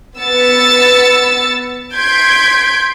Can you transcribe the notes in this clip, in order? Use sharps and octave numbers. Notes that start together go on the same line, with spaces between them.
B3 E6 A6 C#7
C6 G6 G#6 B6 D7